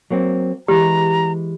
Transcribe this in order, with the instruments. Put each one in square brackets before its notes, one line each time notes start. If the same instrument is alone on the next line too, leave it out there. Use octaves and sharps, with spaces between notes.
[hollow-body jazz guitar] F#3 A#3 C4
[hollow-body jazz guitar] E3 G#3 [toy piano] G4 [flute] A#5